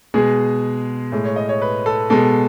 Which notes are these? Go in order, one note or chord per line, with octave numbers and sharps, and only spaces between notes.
B2 G#3 G#4
A2 G#3
C#5
D#5
C#5
B4
A4
B2 G#3 A4